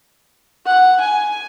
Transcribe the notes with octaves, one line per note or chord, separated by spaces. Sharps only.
F#5
G#5